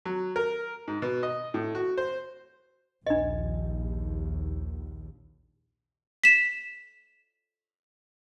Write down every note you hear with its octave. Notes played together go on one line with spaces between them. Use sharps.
F#3
A#4
G#2
B2
D#5
A2
F#4
C5
A#1 D#2 D4 D#5
B6 E7